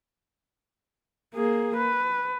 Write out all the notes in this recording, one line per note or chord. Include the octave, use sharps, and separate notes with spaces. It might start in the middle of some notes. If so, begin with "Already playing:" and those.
A#3 G#4
B4